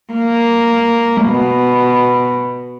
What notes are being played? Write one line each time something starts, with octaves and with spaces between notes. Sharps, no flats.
A#3
B2